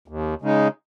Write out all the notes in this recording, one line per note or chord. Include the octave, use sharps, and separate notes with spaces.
D#2
C#3 G#3 D#4